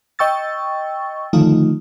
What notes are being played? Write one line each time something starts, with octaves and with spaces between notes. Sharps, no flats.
D#5 G5 C#6 E6 A6
D3 D#3 F3 A3 D#4 F4